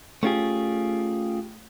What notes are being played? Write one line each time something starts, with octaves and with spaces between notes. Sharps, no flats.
A3 B3 C#4 F4 G4 G#4